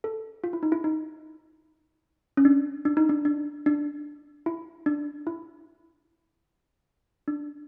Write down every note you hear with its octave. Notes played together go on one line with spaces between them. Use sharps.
A4
F4
E4
D#4
E4
D#4
C#4
D4
D4
D#4
D4
D4
D4
E4
D4
E4
D4